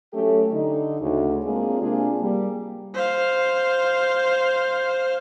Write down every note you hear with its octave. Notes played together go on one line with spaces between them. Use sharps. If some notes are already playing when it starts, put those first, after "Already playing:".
F#3 A3 C#4 G4 A4
D3 D#4
D2 C#3
G#3 A#3 C4 D4 F4 G#4
C3 A#3 D4 F4 G#4
G3 A#3
C5 F5